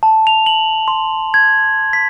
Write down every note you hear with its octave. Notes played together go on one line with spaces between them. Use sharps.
A5
F7
F#7
C6
G#6
B6